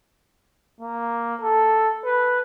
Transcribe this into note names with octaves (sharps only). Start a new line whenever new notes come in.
A#3
A4
B4